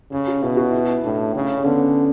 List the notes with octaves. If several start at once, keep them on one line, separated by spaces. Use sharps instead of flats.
C#3 G#4
F#4
B2 E4
F#4
E4
A2 D4
C#3 C#4
C#4
D3 B3